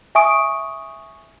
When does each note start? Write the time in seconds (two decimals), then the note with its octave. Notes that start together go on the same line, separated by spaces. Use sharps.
0.15 E5 G#5 C#6 D#6 D7